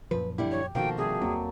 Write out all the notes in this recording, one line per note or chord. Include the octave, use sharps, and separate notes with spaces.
F#2 A#2 F3 B4
D3 G3 E4 G4
C#5
B2 D#3 F3 A#3 F#4 A4 G5
C3 G3 G4 G#4
E2 F#3 A#3 C4